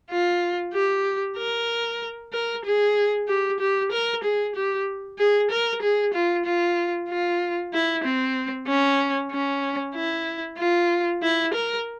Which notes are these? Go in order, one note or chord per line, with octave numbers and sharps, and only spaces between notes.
F4
G4
A#4
A#4
G#4
G4
G4
A#4
G#4
G4
G#4
A#4
G#4
F4
F4
F4
E4
C4
C#4
C#4
E4
F4
E4
A#4